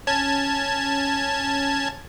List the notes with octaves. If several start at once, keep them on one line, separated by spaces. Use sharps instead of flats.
C#4 A5 G#6